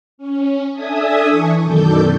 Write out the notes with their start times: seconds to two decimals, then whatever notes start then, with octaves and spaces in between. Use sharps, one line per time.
0.18 C#4
0.72 D4 A4 E5 G#5 D#6
1.28 E3 C#6
1.63 F#2 B2 D#3 A4 D5 G6